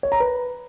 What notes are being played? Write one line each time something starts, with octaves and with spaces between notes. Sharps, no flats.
C#5
A#5
B4